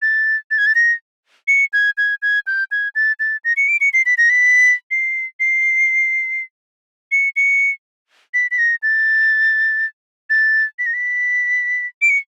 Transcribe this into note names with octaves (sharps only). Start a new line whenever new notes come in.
A6
A6
G#6
A6
A#6
C#7
G#6
G#6
G#6
G6
G#6
A6
A6
A#6
C#7
D7
C#7
C7
B6
A#6
B6
C7
C7
C#7
C#7
B6
B6
A#6
A6
A6
B6
A#6
B6
D7
C#7